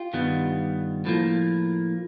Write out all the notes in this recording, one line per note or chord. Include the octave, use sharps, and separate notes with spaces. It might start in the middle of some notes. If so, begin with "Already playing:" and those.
Already playing: F4 G4
G2 D#3 G3 B3
A2 F3 A#3